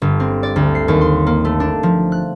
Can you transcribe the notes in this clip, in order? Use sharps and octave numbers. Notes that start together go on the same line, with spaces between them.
G1
C4
D5
D2
C7
D#2
C6
A#3
A3
D4
F3
F#6